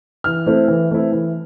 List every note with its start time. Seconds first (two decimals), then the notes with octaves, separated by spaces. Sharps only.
0.24 E3 F6
0.47 A3 C4 E4
0.68 E3
0.91 A3 C4 E4
1.12 E3